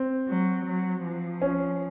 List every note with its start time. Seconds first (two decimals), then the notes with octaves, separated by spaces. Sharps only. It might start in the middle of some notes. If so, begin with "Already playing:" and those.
Already playing: C4
0.28 F#3
0.66 F#3
1.04 F3
1.42 C#4